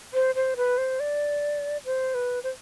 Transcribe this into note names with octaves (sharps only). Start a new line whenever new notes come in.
C5
C5
B4
C5
D5
C5
B4
C5